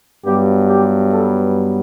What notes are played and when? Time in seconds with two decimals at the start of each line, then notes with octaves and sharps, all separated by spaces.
0.25 G2 F#3 B3 G4
0.68 G4
1.11 A4